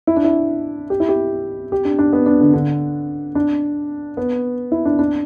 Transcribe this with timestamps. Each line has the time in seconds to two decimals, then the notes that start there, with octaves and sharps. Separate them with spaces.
0.07 E4
0.16 D4
0.24 E4
0.90 G4
1.00 E4
1.09 G4
1.72 G4
1.85 D4
1.99 D4
2.13 B3
2.26 D4
2.41 D3
2.53 D3
3.35 D4
4.17 B3
4.72 E4
4.85 D4
4.99 D4